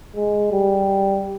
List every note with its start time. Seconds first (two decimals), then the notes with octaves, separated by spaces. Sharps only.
0.16 G#3
0.52 G3